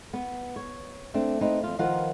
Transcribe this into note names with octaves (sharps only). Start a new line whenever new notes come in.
B3
C#5
A3 C4 D4
C4 D#4 B4
F2 F4
D#3 F3 F4 A#4 B4 F#5